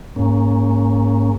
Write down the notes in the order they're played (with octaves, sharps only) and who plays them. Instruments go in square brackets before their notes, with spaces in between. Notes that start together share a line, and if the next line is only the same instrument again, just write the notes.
[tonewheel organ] G#2 A#3 C#4